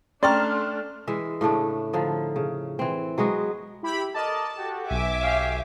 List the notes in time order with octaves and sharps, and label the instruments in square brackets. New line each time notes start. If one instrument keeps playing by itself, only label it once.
[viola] A3 D4 [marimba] C#4 G5 A#5 [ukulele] D5 [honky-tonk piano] C6 F6
[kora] E3 G#3 E5
A2 C#3 A3 D4
D3 F3 D#4
C#3
E3 C4
F#3 G#3 B3 F#4
[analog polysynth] E4 G4 B5
[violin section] A4 [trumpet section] A#4 D5 D#5 [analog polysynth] A5
[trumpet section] F#4 G4
[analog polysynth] B1 G#5 [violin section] E5 D6
[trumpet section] G4 C#5 F5